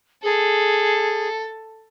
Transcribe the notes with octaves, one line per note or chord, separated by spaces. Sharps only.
G#4 A4